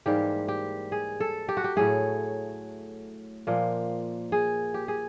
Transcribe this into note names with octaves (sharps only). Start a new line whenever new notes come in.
G#2 E3 G3 A#3 G4
G4
G#4
A4
G4
F#4
G4
A2 F#3 A3 G#4
A#2 F3 A#3
G#4
G4
G#4